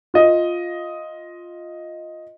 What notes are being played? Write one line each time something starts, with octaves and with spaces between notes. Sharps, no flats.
F4 D#5